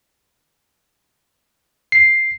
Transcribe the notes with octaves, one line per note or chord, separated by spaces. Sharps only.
C7